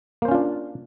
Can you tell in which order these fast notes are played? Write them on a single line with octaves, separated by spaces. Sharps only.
A#3 C5 C#4 F4 D4